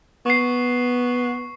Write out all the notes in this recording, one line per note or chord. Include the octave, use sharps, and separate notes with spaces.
B3 C#6 C7